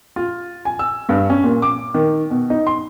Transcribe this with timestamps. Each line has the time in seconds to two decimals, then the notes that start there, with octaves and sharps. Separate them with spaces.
0.16 F4
0.65 G#5
0.79 E6
1.09 G2
1.30 C#4
1.44 A#2
1.62 D6
1.94 D#3
2.30 B2
2.50 D#4
2.67 C6